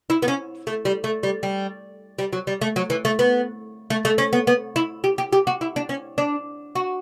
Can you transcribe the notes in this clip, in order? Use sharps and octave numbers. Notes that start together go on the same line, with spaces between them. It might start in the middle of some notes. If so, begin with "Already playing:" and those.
E4
B3
C#4
A3
G3
A3
G3
G3
G3
F#3
G3
A3
F#3
E3
A3
B3
A3
A3
C#4
B3
B3
E4
G4
G4
G4
F#4
E4
D4
C#4
D4
F#4